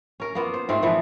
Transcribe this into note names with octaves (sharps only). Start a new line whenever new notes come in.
C#4 A#4
A#3 B3 F4
C5
G#2 A3 C4 F4
A#2 E3 F3 B3